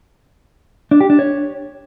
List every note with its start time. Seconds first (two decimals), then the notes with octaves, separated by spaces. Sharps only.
0.91 D4
1.01 G4
1.10 D4
1.19 C#5